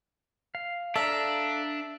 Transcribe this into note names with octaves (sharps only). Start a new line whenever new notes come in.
F5
D4 A4 E5 F5 A#5